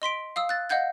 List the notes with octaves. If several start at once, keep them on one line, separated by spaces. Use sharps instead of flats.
D#5 C6 B6 D7
F5 D#6 E6
F#6 A6
D#5 F5 F#5 G6 G#6